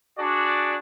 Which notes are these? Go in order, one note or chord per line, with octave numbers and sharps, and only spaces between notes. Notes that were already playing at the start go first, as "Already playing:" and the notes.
D4 F#4 G#4 D5